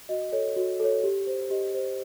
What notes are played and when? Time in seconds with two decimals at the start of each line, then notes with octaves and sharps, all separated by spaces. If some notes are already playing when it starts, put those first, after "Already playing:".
0.09 F#4 D#5
0.32 A4 C#5
0.56 F#4
0.80 A4 C#5
1.04 G4
1.27 C5
1.50 G4 D#5
1.74 C5